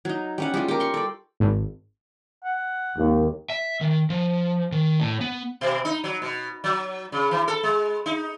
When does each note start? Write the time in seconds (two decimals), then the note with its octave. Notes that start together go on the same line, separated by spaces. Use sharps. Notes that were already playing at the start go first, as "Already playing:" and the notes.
0.05 F#3 D#4
0.38 G3 C#4 F#5
0.54 G3 G#3 F4
0.68 G4 A#4
0.80 C6 C#6
0.94 A4 D5
1.40 G#1
2.44 F#5
2.96 G#1 D#2
3.50 E5
3.81 D#3
4.10 F3
4.72 D#3
5.00 A2
5.21 B3
5.61 B2
5.85 D#4
6.04 F#3
6.22 B2
6.64 F#3
7.12 C#3
7.31 E3
7.48 A4
7.63 G#3
8.06 D#4